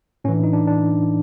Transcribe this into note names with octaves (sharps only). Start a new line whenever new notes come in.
A2 E3 C#4
D4
D#4
D4
D4